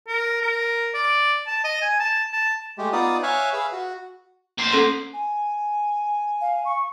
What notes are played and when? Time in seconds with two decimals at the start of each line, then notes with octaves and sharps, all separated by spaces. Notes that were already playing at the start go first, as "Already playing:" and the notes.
0.08 A#4
0.42 A#4
0.94 D5
1.47 A5
1.64 D#5
1.82 G#5
2.00 A5
2.33 A5
2.78 G#3 A3 G4
2.93 B3 D#4 F4 D5 D#6
3.23 C#5 E5 F5 G#5 F#6
3.53 G#4 B4 E5 F5
3.72 F#4
4.58 A#3 C5
4.73 C#4 A4 C6
5.13 G#5
6.41 F5
6.65 C#6